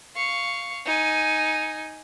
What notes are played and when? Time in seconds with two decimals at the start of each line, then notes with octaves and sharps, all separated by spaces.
0.16 F5 C#6
0.86 D#4 G#5